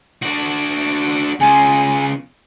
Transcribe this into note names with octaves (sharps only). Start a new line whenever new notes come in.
D4 F#4
C#3 F4 G#5